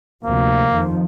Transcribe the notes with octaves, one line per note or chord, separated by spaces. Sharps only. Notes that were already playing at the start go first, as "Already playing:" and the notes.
D2 C3 F3 A#3
F2 D#3 F3